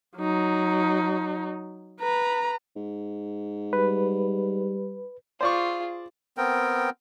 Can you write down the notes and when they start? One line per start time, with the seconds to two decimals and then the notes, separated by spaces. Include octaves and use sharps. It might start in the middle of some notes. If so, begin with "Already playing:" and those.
0.18 F#3 D#4
2.00 B4 A#5
2.76 G#2
3.73 G3 B4
5.41 F4 G#4 C5 D5 C#6
6.37 B3 C4 A#4 G5